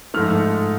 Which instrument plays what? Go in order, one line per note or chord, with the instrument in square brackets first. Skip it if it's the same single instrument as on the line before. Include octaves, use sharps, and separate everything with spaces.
[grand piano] G#2 F3 A3 F6